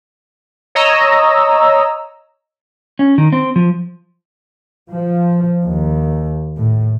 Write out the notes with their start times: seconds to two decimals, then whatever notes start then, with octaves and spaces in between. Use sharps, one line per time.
0.75 C#5 D#5 A#5 E6
2.99 C#4
3.18 D#3
3.32 C4
3.56 F3
4.91 F3
5.64 D#2
6.56 A2